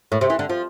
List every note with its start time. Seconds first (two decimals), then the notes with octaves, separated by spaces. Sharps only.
0.12 A2
0.21 C3
0.30 E3
0.39 D3
0.49 F3